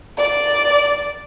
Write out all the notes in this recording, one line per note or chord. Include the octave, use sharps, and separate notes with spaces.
D5